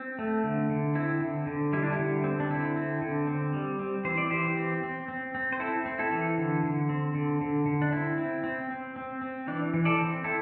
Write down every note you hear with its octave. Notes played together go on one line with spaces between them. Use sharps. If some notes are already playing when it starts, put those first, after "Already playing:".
Already playing: C4
A3
D3
D3
C4 E4
D3
D3
G3 E4
D4
E4
D3
C4
D4
D3 E4
C4
D3
C4
G3
C4
E3 C5
D5
E3 G4 C5
C4
C4
C4
C4
C5
C4 E4 A4
C4
E4 A4
E3
D3
D3
C4
D3
D3
D3
D4
C4 E4
C4
C4
C4
C4
C4
E3 D4
E3
A4 D5
C4
C4 E4 A4